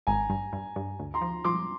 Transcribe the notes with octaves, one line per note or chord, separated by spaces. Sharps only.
G#1 G#5 A#5
G2
G2
G2
D2
A#5 C6
F3
F3 C6 D6